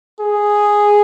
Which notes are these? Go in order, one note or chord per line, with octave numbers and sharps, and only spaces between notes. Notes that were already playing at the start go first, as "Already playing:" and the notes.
G#4